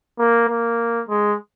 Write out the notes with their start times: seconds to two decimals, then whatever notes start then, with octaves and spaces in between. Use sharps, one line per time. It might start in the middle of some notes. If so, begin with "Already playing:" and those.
0.19 A#3
0.49 A#3
1.09 G#3